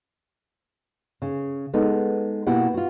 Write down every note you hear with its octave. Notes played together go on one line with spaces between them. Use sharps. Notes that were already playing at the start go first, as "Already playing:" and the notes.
C#3
G#3 B3 D#4 A4
B2 A#3 E4 G4 F#5
F4 F#4